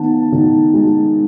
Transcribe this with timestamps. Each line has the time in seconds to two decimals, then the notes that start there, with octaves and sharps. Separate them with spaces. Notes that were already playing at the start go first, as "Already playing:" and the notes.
Already playing: D#3 B3 F#5 A5
0.32 D#3
0.74 G#3